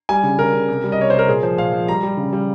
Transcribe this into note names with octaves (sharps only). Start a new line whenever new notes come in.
G3 G#5
C#3
C#3 A#4
C#3
C3
G3
D#5
C3 C#5
C3 C5
A#4
A#2 G#4
F3 C5
A#2 F5
F3
G3 A#5
G3
C#3
G3